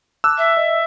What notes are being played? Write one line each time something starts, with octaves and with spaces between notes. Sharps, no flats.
A5 D6 E6 F#6
E5
D#5